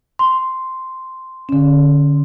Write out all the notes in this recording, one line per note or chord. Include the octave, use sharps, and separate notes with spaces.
C6
D3 C#4